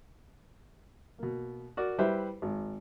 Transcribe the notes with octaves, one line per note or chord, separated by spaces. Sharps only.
B2 A#3
F#4 A#4 D5
G3 E4 G4 B4 C5 E5
G#1